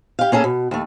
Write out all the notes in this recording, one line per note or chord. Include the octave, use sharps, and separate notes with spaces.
G4 F5
A#3 C#4 G#4 A4
B2
D#2 A3